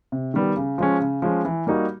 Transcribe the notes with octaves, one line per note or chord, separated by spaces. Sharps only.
C3
D#3 G3 B3
C#3
F3 G#3 C#4
C#3
F3 G#3 C#4
E3
G3 A#3 D#4 F#4